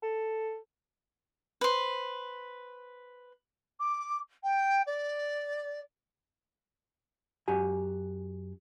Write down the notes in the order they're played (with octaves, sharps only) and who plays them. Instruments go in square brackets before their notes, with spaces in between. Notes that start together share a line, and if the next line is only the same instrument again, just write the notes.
[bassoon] A4
[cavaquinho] B4 C5
[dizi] D6
G5
D5
[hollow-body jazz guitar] F#2 F#4 G4 G#5